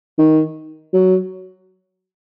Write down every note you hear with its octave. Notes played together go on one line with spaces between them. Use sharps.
D#3
F#3